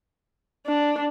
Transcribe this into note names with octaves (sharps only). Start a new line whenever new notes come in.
D4